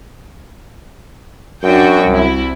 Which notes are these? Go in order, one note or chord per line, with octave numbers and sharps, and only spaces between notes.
F#2 D4 F#4 G5
C2 E4